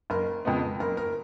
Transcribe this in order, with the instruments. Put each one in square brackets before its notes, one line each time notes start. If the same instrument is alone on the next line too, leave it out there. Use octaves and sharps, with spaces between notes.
[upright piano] F#1 A#4
F2 C#3 G#3 B3
F#1 A#4
A#4